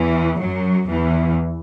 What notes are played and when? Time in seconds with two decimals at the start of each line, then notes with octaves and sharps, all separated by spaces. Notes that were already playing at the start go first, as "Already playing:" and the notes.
Already playing: E2 E3
0.40 F#2 F#3
0.89 E2 E3